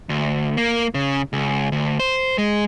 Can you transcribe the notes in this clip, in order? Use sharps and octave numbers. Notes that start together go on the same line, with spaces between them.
D2
A#3
C#3
C#2
D2
C5
G#3